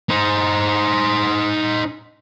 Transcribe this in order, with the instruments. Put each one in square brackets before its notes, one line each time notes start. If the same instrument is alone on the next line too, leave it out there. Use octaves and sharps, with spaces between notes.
[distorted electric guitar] D#4 C5